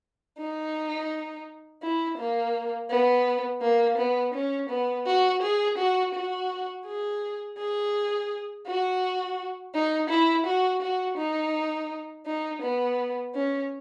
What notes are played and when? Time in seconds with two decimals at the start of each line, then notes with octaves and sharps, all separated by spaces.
0.38 D#4
1.82 E4
2.18 A#3
2.90 B3
3.62 A#3
3.98 B3
4.34 C#4
4.69 B3
5.06 F#4
5.42 G#4
5.78 F#4
6.14 F#4
6.86 G#4
7.58 G#4
8.67 F#4
9.74 D#4
10.10 E4
10.46 F#4
10.82 F#4
11.17 D#4
12.26 D#4
12.62 B3
13.34 C#4